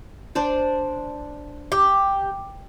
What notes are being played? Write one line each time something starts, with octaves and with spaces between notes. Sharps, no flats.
D4 C5 D5
G4